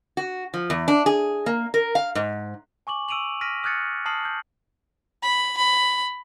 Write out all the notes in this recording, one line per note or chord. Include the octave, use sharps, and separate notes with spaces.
F#4
F3
E2
D4
G#4
A#3
A#4
F5
G#2
G#5 C#6 D6 F#7
C#6 E6 D7 D#7 F7 F#7
F6 A#6 B6 D7 D#7
D#6 F6 F#6 G#6 A6 C#7
A5 D#6 F6 C7 F#7
G6
B5
B5